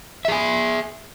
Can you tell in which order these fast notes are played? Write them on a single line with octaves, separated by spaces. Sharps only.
E5 G#4 G#5